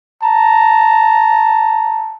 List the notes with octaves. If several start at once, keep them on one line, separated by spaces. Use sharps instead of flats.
A5 A#5